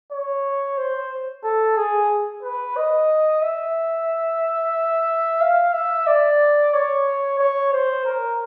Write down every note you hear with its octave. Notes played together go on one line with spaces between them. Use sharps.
C#5
C5
A4
G#4
B4
D#5
E5
F5
E5
D5
C#5
C#5
C5
A#4